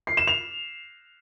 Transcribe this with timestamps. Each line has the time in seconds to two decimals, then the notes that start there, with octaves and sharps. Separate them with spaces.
0.07 C7
0.17 E7
0.27 F7